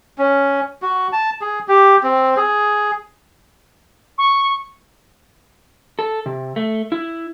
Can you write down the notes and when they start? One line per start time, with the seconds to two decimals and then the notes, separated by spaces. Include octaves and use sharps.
0.18 C#4
0.82 F#4
1.12 A5
1.41 G#4
1.68 G4
2.03 C4
2.37 G#4
4.18 C#6
5.99 A4
6.26 C3
6.56 A3
6.92 E4